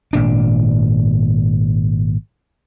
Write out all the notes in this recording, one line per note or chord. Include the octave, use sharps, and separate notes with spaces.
G#1 A#2 D4